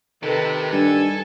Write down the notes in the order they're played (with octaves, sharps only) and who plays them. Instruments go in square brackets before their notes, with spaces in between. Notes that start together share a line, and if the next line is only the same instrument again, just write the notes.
[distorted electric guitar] C3 [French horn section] D#3 [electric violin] A4 B4
[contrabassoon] G2 [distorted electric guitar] A4 [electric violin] G#5